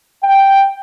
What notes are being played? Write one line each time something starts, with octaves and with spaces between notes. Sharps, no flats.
G5